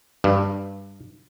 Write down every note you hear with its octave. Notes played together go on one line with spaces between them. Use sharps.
G2